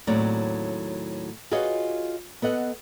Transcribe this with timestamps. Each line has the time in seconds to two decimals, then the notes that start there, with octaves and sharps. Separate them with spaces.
0.07 D#2 A2 F#3 C4 C#5 D5
1.51 F4 F#4 G#4 B4 C#5 D#5
2.42 B3 A4 D#5 F#5